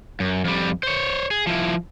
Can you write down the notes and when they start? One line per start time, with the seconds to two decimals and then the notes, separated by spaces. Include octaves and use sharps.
0.20 F#2
0.45 F2 G3
0.83 C5 C#5
1.31 G#4
1.47 F3 E4